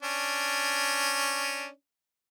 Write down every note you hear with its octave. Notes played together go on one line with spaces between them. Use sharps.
C#4 D4